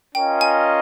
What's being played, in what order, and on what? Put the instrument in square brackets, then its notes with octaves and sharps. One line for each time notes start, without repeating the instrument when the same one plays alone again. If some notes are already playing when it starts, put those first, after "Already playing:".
[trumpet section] C#4 F4 A#4 D#5 [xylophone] G5
[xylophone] G#5